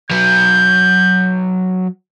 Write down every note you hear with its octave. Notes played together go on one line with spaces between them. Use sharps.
F#3 B4 G6